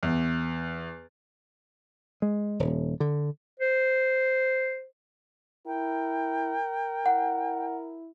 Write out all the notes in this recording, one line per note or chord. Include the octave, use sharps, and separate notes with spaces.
E2
G#3
D#1
D3
C5
E4 A#4 G5
E4 F#5